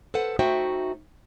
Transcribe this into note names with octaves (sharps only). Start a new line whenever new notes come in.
A4 B4 C5 F#5
A3 D#4 F#4 C5 E5 G5